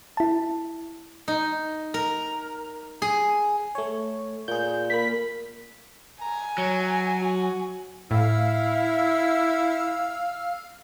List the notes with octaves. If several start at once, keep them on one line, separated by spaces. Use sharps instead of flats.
E4 A5
D#4
A#4
G#4
A3 C#5
A#2 G#4 G6
A#3 A#4 B5 B6
G#5 A#5
F#3 C#5
F#4
A2 E4 F5 E6